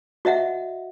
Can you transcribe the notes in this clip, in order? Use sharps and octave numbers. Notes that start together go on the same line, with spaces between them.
F#4 D#5 E5 F#5